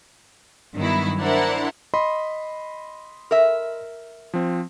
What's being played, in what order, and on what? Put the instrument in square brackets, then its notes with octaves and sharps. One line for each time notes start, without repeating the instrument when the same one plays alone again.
[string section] G2 D#3 F#3 B3 E4
D4 E4 A#4 C5 F#5
[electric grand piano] D#5 B5 C6
[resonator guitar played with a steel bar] A#4 E5
[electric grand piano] F3 C4